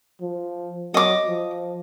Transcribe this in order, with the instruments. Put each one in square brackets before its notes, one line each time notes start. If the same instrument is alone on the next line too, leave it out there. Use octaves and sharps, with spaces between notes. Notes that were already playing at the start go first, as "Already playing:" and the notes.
[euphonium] F3
[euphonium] F#3 [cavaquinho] D#5 D6
[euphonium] F3